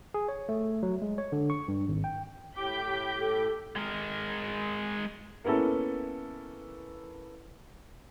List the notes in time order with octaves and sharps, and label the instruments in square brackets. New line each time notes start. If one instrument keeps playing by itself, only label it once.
[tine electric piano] G#4
C#5
A3
F#3
G#3
C#5
D3
C#6
G2
G#1
G5
[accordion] A2 G4 D6 [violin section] G6 B6
[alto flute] A4
[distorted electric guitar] G#3 A#4
[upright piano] A#3 B3 C#4 E4 A4